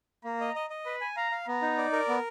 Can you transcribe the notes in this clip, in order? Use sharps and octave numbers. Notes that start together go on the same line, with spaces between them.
A#3 A#5
D#5
D#5
D#5
B4 B5
G#5
F5 A#5
F5
B3 A#5
D#4
D5
A#4
B3